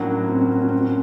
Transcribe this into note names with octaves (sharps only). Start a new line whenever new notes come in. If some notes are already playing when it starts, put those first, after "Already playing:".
Already playing: A2 F#3 A#3 C#4 D4 F#4
C4
C#4
C4
C#4
C4
C#4